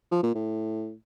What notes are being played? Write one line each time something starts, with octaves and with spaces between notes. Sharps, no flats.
F3
A#2
A2